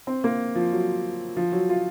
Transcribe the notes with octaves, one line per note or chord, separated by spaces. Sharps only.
C4
A#3
F3
F#3
F3
F#3
F4